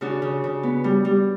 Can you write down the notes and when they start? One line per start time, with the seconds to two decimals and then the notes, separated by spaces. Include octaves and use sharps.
0.01 C#3 D4 F#4
0.22 C#3
0.44 C#3
0.63 B3
0.84 G3
1.05 G3